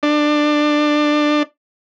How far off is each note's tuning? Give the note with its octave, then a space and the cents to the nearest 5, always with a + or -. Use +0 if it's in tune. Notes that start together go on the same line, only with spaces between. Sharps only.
D4 +20